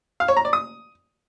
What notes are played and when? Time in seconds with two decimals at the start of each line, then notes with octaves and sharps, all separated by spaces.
0.20 F5
0.28 C#5
0.37 A#5
0.45 D5
0.53 D#6